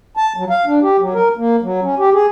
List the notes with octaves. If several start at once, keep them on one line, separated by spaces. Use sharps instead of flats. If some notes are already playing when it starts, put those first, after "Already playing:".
A5
F#3
F5
D4
G4
F#3
A#4
A#3
F#3
C#4
G4
G#4